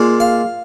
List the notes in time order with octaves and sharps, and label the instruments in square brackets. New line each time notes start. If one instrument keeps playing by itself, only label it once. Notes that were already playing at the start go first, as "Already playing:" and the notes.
Already playing: [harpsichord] A#2 G#3
F5